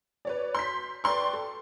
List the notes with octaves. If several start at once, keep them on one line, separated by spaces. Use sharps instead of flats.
B4 C#5 D5
C6 G6 B6
B4 D5 G5 C6 C#6
A4